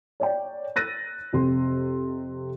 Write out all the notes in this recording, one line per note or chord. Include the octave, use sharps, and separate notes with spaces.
C#5 D5 G5
E6 F#6 A6 A#6 D#7
F2 C3 C4 C6